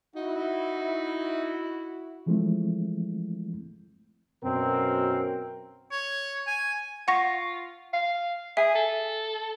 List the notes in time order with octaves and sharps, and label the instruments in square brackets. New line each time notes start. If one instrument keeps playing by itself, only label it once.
[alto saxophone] D#4 [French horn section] E4 F#4
[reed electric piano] E3 F3 G#3 A3 C4 E4
[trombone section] F#2 B2 C4 A#4
[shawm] C#5
G#5
[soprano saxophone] F4 [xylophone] F#5 C#6 A#6
[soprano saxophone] F5
[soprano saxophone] G#4 [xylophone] E5
[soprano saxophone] A4